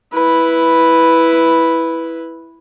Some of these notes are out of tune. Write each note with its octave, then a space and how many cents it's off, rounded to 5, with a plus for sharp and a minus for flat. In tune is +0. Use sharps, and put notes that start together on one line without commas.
E4 +0 B4 +0